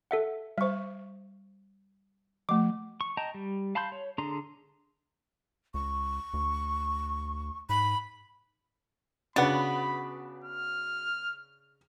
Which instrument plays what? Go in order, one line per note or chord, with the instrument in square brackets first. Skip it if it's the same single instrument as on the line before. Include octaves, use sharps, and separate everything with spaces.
[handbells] A4 E5 F#5
[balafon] G3 C5 [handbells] E5 C#6
[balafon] F3 A3 [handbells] D6
[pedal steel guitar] C#6
D#5 G5 A5 A#5
G3
F5 A5 B5 C6 G6
C#5
D3 D4 G#4 A#5 C6
[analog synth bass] C#2 [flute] C#6
[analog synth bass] D2
[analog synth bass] G#2 [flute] B5
[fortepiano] C#3 D4 [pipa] B3 [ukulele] F#4 D5 F#5 [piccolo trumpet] B5
[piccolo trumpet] F6